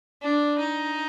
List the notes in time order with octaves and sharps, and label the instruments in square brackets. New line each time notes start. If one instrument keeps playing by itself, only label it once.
[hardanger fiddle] D4
D#4